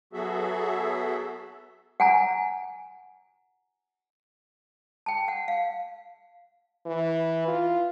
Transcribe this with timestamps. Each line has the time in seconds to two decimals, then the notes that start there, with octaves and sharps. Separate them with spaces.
0.13 F#3 B3 F#4 G#4 A4 E5
2.00 F#5 G#5 A#5
5.06 G5 A5
5.28 F#5
5.48 F5
6.86 E3
7.48 F4